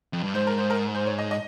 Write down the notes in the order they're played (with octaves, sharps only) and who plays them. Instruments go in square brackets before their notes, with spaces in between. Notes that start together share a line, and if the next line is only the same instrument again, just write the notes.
[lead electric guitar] F2
G2
[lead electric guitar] G#2 [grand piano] C5
[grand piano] A#4
C5
A#4
C5
C#5
D#5
D#5